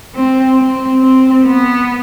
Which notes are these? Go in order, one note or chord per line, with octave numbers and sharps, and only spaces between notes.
C4
C4
C4
B3